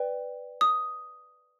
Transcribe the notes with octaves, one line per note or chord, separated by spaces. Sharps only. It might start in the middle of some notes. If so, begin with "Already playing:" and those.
Already playing: B4 D5 G5
D#6